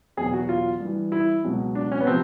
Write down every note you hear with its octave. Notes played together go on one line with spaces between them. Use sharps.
E2 B2 F#3 G#4
F#4
F4
G2
E3
E4
C#2 B2 F#3
D4
C#4
B3
C3 F3 C4